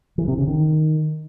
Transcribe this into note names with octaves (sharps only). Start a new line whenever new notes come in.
E3
C3
C#3
D#3